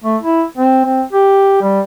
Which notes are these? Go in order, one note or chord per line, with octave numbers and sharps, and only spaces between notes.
A3
E4
C4
C4
G4
G3